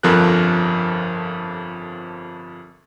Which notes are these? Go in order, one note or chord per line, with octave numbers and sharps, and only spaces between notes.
G1 F2 F3 A4 A#4 F#6